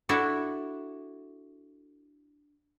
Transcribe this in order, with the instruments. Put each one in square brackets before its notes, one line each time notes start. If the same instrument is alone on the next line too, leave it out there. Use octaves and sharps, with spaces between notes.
[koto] D4 E4 F#4 A4 D5 E5